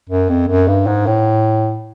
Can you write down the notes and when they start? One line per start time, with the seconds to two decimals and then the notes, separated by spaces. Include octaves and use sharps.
0.09 F#2
0.29 F2
0.48 F#2
0.68 G2
0.87 G#2
1.06 A2